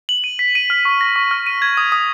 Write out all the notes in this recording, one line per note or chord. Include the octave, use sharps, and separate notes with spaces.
F#7
D#7
B6
D#7
F6
C#6
A#6
C#6
F6
D#7
G#6
D#6
D#6